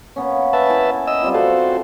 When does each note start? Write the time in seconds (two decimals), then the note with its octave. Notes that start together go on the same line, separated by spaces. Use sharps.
0.16 A#3 B3 C#4
0.53 B4 E5 A5
0.70 E4 G#5
1.07 D#5 E6
1.22 G3 C4 F4
1.34 A3 F#4 A4 C5